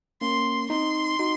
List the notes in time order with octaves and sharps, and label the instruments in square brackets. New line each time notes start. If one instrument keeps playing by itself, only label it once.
[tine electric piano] A#3 C#4 [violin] C6
[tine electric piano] C4 D#4 [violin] C6
[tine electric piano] D#4 F#4